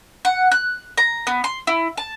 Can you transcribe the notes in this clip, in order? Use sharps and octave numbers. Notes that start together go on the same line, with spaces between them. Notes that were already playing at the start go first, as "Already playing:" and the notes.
F#5
F#6
A#5
B3
C6
E4
A5